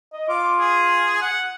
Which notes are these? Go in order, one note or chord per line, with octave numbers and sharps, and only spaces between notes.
D#5
F4 D6
G#4
F#5